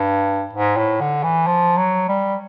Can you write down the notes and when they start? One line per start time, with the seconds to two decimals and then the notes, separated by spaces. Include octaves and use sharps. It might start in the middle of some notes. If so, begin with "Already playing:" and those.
Already playing: G2
0.53 G#2
0.77 A2
1.01 D3
1.23 E3
1.47 F3
1.77 F#3
2.09 G3